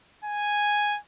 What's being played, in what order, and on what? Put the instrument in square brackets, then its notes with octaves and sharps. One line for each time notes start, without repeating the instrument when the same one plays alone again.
[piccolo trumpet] G#5